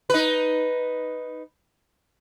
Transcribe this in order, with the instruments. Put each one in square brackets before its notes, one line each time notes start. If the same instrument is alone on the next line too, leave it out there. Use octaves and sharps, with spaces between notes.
[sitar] D#4 B4